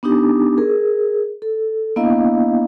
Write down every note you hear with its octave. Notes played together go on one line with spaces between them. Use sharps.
B3 D4 D#4 G4 D6
G#4 A#4
A4
A#3 B3 D4 E4 D#5 F5